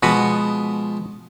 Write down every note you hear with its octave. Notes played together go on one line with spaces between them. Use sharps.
B2 F3 G#3 B3 F#4 B4